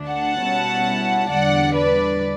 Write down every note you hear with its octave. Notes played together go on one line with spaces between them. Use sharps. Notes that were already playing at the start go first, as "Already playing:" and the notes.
Already playing: D2 D3 A3 D4
F#5 A5
B2 G3 C#4 E4
E2 D3 G3 D4 D5 F#5
B4 D5